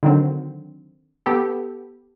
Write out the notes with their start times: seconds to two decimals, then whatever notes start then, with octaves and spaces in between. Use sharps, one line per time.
0.03 D3 D#3 F#3 C4
1.26 B3 G4 A4